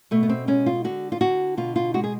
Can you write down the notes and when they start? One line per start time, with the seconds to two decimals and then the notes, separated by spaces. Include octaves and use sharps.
0.11 B2 A3
0.23 B3
0.29 C4
0.47 G#3 C#4
0.66 F4
0.84 D3 F#4
1.12 F4
1.21 D3 F#4
1.57 B2 F4
1.76 F4
1.94 G#3 F#4
2.04 G#4